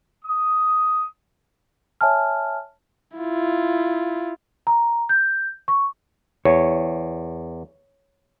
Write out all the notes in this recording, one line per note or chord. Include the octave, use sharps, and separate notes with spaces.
D#6
C#5 E5 G#5 A5 F6
E4 F4
A#5
G6
C#6
E2 C#5